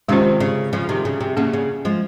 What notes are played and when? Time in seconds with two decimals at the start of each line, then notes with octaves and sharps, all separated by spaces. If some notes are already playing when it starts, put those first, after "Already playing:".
0.08 C3 D#3 G#3 C#4 F4 C5
0.40 C#3
0.73 C#3 F3
0.89 C3 D#3
1.05 C#3
1.21 C3
1.37 C#3 A#3 C#4 G#4
1.53 C#3
1.85 F3 G#3